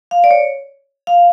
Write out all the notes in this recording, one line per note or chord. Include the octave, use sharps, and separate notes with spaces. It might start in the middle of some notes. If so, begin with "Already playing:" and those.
F5
D5
C#5
F5